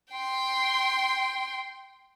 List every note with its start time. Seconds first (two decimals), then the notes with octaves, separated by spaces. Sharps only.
0.12 G5 C6